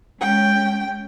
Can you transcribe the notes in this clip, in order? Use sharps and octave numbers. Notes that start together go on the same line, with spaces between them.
G#3 C#4 G5